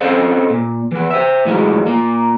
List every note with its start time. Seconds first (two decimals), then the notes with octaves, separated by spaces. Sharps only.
0.01 C4 C#4 A4 C5 D#5 F5
0.50 A#2
0.92 E3 B3
1.10 C5 E5
1.45 A2 E3 F#3 G#3
1.87 A#2 A#3